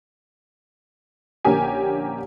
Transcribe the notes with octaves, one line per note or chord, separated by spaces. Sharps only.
A#1 D3 A#3 C#4 G4 G#5